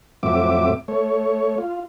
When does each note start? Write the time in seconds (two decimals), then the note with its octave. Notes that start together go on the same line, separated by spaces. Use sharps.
0.23 F2 A2 F#3 C4 E5 D6
0.88 A3 C#5
1.58 F4